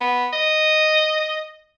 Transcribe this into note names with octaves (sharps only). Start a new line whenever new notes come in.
B3
D#5